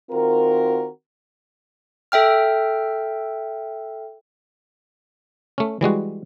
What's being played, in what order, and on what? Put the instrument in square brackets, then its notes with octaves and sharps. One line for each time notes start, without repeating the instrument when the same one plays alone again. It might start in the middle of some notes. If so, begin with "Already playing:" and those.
[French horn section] D#3 C4 F4 F#4 A#4
[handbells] A4 E5 G5 F6
[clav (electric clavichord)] A3 C#4
E3 G3 G#3 F#4